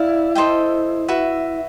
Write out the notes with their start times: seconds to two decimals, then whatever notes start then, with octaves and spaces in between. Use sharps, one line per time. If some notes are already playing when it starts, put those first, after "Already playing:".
Already playing: E4 D5 F5
0.35 A4 C5 D#5 G5
1.08 F#4 B4 E5